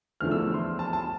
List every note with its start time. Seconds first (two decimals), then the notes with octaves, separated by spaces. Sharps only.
0.20 E2 D3 F3 A3 F6
0.31 E6
0.54 C6
0.79 A5
0.93 A5